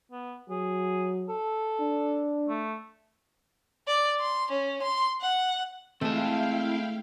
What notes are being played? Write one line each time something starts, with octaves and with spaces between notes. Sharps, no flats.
B3
F#3 G#4
A4
D4
A3
D5
C6
C#4
C6
F#5
G#3 A3 C4 E4 F5 G5 A5